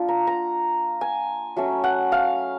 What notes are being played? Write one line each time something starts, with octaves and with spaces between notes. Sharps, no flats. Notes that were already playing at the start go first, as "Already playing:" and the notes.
Already playing: A#3 D4 F4
A#5
A#5
G#5
F#3 A3 C#4
F#5
F5